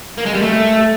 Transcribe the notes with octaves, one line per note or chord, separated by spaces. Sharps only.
A#3
G#3
G3
A3